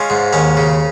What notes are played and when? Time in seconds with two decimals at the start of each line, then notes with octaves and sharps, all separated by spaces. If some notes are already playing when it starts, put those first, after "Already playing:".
Already playing: G#3 C#4 F4
0.10 G#2
0.33 D#2 C#4
0.57 C#3